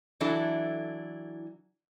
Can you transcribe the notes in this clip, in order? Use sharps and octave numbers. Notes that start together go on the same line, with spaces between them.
E3 F#3 D4 E4 A4